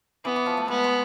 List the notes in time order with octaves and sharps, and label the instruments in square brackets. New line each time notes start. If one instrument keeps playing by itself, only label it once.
[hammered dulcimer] E3 [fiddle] B3
[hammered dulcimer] E3
F3
A3
[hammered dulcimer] G#3 [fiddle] B3
[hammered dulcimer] G#3